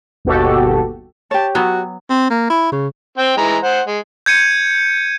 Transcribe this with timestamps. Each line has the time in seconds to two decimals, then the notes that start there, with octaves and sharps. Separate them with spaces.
0.25 G1 D#2 B2 F#4 G4 A4
1.31 G4 C#5 A5
1.55 F#3 B3 F#4
2.10 C4
2.30 A#3
2.50 E4
2.72 C#3
3.18 C4 G5
3.37 E3 G#3 A#5
3.64 C5 F#5
3.87 G#3
4.26 G6 G#6 C#7 D#7